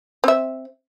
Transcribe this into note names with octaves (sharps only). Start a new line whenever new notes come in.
C4 E5